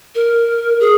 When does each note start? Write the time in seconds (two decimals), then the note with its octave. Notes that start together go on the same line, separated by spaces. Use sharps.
0.15 A#4
0.80 G#4